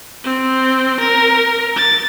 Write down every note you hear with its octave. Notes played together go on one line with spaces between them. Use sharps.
C4
A#4
A6